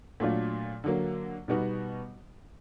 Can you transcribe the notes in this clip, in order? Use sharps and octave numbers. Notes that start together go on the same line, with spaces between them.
A#2 F#3 A3 D4 F4
D3 F#3 A#3
B2 G3 B3 D#4 F#4